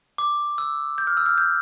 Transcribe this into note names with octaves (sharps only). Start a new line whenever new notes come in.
D6
E6
G6
F6
E6
F6
G6